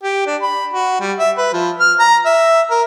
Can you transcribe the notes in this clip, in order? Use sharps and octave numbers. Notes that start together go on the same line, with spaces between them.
G4
D4
B5
F#4
G3
E5
B4
F3
F6
A#5
E5
A#4